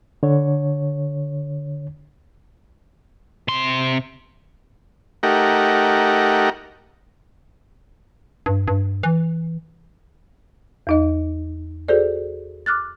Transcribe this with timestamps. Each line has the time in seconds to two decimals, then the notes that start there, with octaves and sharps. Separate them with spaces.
0.23 D3 C#5
3.48 C3 C6
5.23 A3 D#4 G4 A#4 F#5
8.46 G2
8.68 G2
9.03 E3
10.87 E2 D#4 D#5
11.88 F#4 G#4 A4 C5 D5
12.66 D6 F6 F#6 A6